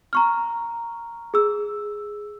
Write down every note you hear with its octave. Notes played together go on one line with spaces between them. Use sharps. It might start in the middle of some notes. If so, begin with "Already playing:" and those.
A#5 C#6 F6
G#4 E6